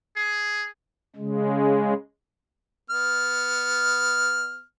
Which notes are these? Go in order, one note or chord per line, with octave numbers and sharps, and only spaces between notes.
G#4
C#3 G#3
B3 F6